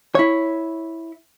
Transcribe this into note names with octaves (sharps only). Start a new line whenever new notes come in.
E4 C#5